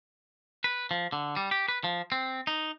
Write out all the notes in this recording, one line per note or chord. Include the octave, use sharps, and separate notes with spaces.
B4
F3
D3
G3
G4
B4
F3
C4
D#4